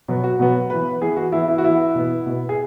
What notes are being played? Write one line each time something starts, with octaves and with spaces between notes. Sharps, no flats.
B2 F#3 B3
F#4
B2 F#3 B3
E3 B3 B4
E3 B3 G#4
F#4
E3 B3 E4
E4
F#4
E3 B3 E4
B2 B3
B2 B3
G#4